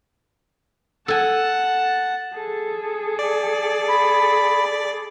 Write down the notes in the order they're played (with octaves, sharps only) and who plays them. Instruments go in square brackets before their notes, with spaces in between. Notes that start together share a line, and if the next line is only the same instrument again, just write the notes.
[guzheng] A4 G#5 [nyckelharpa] F#5 A5
[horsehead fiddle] G#4 A4
[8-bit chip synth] D5
[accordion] B5